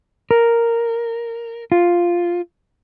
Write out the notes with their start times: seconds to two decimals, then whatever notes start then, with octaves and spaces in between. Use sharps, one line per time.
0.31 A#4
1.72 F4